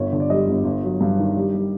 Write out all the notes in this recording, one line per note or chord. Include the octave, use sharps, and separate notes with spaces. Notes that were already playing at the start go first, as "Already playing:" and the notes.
Already playing: G1 C#5
D3
D5
G3 D#5
G1
G1
F#3
G2
D#3
G3
G3